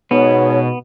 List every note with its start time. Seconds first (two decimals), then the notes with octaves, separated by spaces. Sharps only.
0.11 G#2 B2 B3 C#5